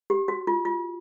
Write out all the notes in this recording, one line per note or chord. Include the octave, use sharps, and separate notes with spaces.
G4
F#4
F4
F4